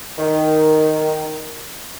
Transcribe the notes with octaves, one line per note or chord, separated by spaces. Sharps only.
D#3